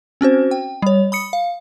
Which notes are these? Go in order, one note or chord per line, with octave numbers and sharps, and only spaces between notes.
C4 C#4 F#4 C5
G5
G3 C#5
B5 D#6 C#7
F5